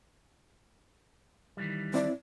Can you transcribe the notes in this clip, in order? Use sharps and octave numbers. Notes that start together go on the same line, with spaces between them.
D#3 E3 G3
C4 E4 D5